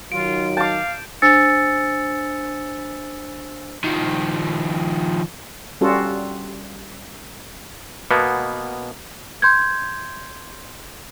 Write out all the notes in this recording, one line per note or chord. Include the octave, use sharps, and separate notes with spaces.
D#3 F#3 F4 D7
F5 A5 D6 G6
D4 C5 G#5 E6 A6 C#7
D#3 F3
G3 C#4 F4 F#4 A4
B2 A#3 B3
C6 G6 G#6